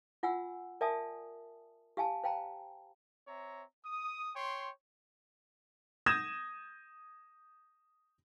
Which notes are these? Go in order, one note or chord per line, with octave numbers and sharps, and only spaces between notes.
F4 F#5 G#5 E6
A#4 D5 E5 G#5 A5 D#6
G4 F5 G#5 A5
C5 F5 G5 A5 A#5
C4 C#5 E5 A#5
D#6
C#5 G5 C6
D#6 G6 G#6 A#6 E7